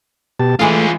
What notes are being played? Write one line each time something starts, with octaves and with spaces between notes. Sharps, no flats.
B2 G4 A5
E3 G#3 A3 F4 G#4 F5